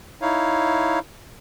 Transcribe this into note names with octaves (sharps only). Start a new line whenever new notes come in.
D#4 E4 C#5 F5